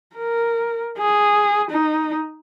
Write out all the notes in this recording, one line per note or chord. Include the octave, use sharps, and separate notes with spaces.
A#4
G#4
D#4